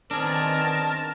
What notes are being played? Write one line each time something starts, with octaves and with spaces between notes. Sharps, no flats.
D#3 B3 C4 D4 G#4 A#4 A5